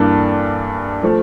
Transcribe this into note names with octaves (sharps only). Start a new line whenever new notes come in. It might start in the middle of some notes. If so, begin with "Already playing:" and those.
Already playing: G2 E3 A#3 D4 A4
F3 A3